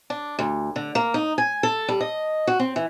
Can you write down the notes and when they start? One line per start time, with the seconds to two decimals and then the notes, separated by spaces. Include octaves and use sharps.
0.10 D4
0.39 D2
0.76 D3
0.95 A#3
1.14 D#4
1.38 G#5
1.63 A4
1.88 G3
2.00 D#5
2.47 F#4
2.60 C4
2.76 E3